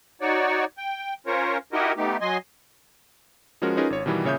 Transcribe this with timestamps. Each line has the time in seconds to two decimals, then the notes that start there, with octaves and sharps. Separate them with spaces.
0.21 D#4 F#4 C#5 D5
0.78 G5
1.27 C#4 F4 A#4 C5 C#5
1.73 D#4 E4 F#4 G4 A#4 D#5
1.97 A3 B3 D#4 G4
2.21 F#3 D#5 G#5 C6
3.62 F3 G#3 C#4 F#4 A#4
3.77 C#4 D#4 F4 G#4 A#4 B4
3.90 G#1 C#5
4.06 B2 D#3 E3 G3 B3
4.24 A#2 C#3 C#5 E5 D#6 G6